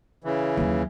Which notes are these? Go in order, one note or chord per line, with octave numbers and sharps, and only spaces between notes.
C#3 E3
D#2 F#3